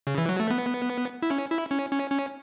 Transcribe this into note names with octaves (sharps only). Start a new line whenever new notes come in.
C#3
E3
F#3
A3
B3
E4
C#4
E4
C#4
C#4
C#4